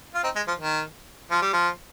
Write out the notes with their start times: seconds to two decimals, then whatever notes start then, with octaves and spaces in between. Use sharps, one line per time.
0.14 F4
0.24 C4 D#4
0.36 G#3
0.47 F3
0.60 D#3
1.31 F3
1.42 G3
1.53 F3